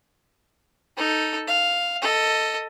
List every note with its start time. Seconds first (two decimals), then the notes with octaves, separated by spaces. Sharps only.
0.97 D#4 A4
1.47 F5
2.02 A4 D#5